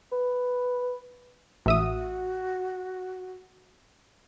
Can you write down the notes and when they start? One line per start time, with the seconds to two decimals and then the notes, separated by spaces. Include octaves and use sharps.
0.12 B4
1.66 A1 F#4 E5 D#6